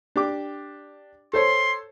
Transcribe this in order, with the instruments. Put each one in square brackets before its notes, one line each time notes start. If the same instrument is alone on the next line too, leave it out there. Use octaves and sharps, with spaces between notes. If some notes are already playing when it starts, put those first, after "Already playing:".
[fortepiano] D4 G4 D6
[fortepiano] A4 C5 C#5 [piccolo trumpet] C6